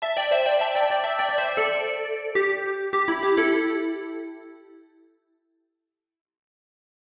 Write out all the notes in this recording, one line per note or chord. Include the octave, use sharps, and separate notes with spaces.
E5 A5
D5 G5
C5 E5
D5 G5
E5 A5
D5 G5
D5 G5
E5 A5
D5 G5
D5
C5 E5
A4 D5
G4
G4
E4
G4
E4 A4